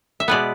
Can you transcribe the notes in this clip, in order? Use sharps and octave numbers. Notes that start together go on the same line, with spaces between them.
E5
B2 G#3 B3 B4 D5